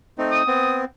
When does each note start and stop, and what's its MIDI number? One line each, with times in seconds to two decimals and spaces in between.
0.18 0.42 57
0.18 0.42 60
0.18 0.42 63
0.32 0.79 87
0.47 0.84 59
0.47 0.84 60